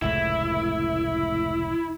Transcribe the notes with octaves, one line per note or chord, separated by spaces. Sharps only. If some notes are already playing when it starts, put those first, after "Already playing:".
F1 C#2 A2 E4